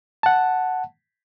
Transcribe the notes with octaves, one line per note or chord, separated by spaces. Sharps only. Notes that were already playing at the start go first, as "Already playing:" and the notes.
F#5 A5